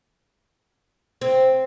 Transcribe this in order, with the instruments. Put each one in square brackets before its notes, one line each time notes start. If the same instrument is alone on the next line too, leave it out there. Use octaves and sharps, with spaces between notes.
[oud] C4